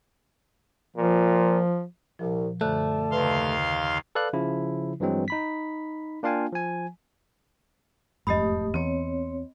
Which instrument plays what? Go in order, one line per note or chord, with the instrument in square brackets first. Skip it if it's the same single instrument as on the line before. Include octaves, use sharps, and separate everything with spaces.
[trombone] A#2 [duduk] F3
[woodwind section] C2 [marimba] A#2 F3
[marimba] F#2 D3 F#6 [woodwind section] F3 D5 A5 [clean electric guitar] A3
[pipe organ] D#2 F5 C6 [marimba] C#3 B4
[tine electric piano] A4 B4 D5 F5 F#6
C#3 F3 E4
G2 E3 F#3 G#3 C4
D#4 B5 B6
A#3 D4 F4 F5 G5 G#5
F3 G#5
[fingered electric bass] E1 F2 G#2 [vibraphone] A3 G4 D#6 [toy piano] D#5 B5
[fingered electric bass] E2 [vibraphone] C4 C#5